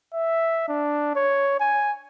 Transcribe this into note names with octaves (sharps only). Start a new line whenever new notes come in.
E5
D4
C#5
G#5